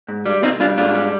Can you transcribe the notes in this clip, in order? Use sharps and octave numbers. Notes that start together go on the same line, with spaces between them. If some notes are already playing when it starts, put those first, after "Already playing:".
G#2
G3
C2 C4 D#4
G3 D4 F4
G#2 D4 F4
G3